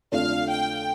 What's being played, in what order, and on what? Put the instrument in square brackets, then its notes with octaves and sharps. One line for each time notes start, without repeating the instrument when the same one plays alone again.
[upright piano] F2 D3 A3 D4 F4 [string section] F5
[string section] G5